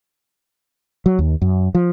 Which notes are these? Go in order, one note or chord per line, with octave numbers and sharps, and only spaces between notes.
F#3
D#2
F#2
F3